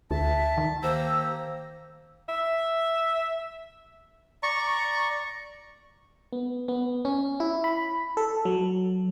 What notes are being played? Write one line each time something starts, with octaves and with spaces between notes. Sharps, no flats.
D2 E5 A5
D#3
A#3 G4 C5 A#5 E6
E5
D5 A#5 C#6
B3
B3
C#4
E4
B5
A4
F#3